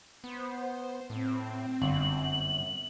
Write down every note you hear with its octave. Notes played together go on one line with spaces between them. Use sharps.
B3 C5
A2 C4
G1 F#2 F#7